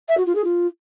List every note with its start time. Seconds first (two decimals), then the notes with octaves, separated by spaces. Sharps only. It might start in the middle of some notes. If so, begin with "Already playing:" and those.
0.08 E5
0.17 F#4
0.26 F4
0.35 G#4
0.44 F4